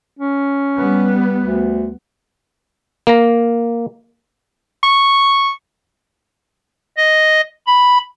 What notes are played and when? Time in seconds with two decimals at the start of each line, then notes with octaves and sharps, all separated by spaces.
0.19 C#4
0.76 G3 B3
1.42 D2
3.07 A#3 A#5
4.83 C#6
6.97 D#5
7.67 B5